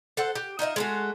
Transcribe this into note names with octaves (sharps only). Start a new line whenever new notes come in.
A4 C5 F#5
G4
D#4 F4 D#5 E5
G#3 A3 F#4